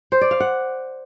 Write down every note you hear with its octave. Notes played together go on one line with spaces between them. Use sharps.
C5
D5
F5
F#5